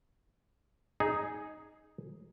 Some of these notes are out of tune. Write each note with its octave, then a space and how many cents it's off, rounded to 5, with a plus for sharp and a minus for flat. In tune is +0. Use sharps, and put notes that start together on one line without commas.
D#4 +0 G#4 +0